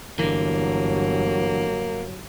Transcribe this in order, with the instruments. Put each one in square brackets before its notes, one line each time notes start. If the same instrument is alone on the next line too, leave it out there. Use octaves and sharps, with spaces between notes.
[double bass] G1 [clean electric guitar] D3 E3 [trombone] F#3 [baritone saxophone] A#3